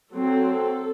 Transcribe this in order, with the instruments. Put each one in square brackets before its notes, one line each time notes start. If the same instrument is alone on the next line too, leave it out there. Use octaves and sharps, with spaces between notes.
[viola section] F#3 C4 A4